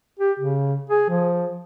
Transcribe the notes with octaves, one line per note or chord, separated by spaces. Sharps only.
G4
C#3
G#4
F3